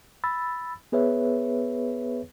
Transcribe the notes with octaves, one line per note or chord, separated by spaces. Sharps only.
B5 E6 A6
B3 G#4 B4 C#5 E5